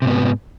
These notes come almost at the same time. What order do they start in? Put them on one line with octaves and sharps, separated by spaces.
C3 G#2 B3